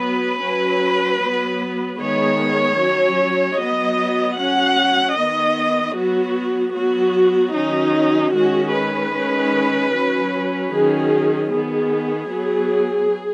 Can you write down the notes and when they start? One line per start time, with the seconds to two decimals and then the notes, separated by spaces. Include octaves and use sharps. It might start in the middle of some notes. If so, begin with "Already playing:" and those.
Already playing: F#3 B3 B4
0.41 F#3 C#4
1.21 F#3 B3
2.00 D#3 G#3 B3 C#5
2.79 F#3 C#4
3.58 F#3 B3 D#5
4.38 F#3 C#4 F#5
5.17 D#3 B3 D#5
5.96 F#3 B3 F#4
6.75 F#3 B3 F#4
7.55 D#3 F#3 C#4 D#4
8.34 D#3 G#3 C#4 F#4
8.74 B4
9.13 D#3 G#3 C#4
9.92 F#3 C#4
10.72 D#3 F#3 C#4 G#4
11.51 D#3 B3 G#4
12.30 F#3 B3